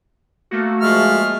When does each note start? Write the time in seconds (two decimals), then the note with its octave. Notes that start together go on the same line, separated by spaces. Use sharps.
0.51 A3 A#3 F#4
0.81 F3 G#3 E5 F6